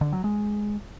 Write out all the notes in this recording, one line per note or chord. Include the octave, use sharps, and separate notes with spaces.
D3
F#3
G#3